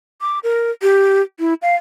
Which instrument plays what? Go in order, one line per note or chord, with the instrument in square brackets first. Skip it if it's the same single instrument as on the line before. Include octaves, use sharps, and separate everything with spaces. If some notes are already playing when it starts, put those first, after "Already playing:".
[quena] D6
A#4
G4
E4
F5